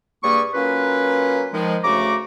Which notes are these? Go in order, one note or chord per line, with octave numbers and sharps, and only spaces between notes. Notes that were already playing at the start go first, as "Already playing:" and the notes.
G2 G3 A#3 G#4 C#6
F#3 A#3 C#4 F4 B4
D#3 F3 G#3
D2 C#3 A3 F#4 A#5 D6